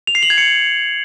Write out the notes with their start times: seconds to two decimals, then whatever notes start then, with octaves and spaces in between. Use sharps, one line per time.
0.07 F7
0.15 C7
0.23 F#7
0.30 G#6
0.38 C#7